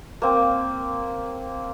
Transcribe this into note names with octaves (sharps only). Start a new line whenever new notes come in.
A#3 C4